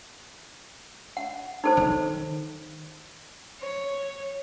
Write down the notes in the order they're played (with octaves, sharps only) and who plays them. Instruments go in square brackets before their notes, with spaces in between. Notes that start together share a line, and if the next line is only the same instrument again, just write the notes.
[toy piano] F#5
D#4 A4 C5
[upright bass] D#3
[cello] C#5